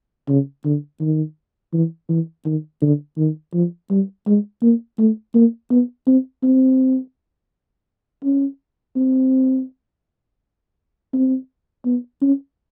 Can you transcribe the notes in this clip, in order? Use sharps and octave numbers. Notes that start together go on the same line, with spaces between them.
C#3
D3
D#3
E3
E3
D#3
D3
D#3
F3
G3
G#3
A#3
A3
A#3
B3
C4
C4
C#4
C4
C4
B3
C#4